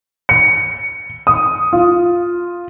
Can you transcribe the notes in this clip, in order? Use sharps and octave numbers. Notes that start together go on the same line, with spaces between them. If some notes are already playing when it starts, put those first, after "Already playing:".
C#7
D#6
F4